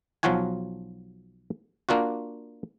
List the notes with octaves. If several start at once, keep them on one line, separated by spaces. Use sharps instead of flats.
B1 F3 F#3 F4 F#4 G#5
A#3 D4 F4 F#4